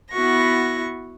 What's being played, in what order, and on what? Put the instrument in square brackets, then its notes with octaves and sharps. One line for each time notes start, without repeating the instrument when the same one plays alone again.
[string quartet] B3 E4 F#4 C#6 A#6